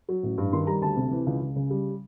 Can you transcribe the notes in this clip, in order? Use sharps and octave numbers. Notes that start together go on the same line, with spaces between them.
F#3
A1
G2
D#3 C6
G3 A#5
D2 A5
C3
E3
C#2
C#2
C#3
G3